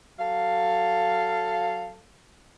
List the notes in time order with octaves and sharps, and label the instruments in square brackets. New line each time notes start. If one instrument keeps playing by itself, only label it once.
[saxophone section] F#3 A4 F5